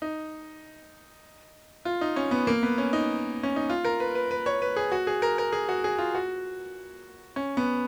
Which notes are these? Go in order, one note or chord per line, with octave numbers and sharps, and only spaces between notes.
D#4
F4
D#4
C#4
B3
A#3
B3
C#4
D#4
C#4
D#4
F4
A#4
B4
B4
B4
C#5
B4
G#4
F#4
G#4
A#4
A#4
G#4
F#4
G#4
F4
F#4
C#4
B3